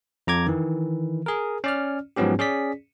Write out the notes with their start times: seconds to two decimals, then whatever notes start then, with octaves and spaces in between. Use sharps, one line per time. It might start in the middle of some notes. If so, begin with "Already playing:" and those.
0.27 F2 A#5 D6 G#6
0.46 D#3 E3
1.26 G#4 A#4
1.64 C#4 D5 F6
2.16 G#2 F3 F#3 B3 C#4 G4
2.39 C#4 G#4 D5 B6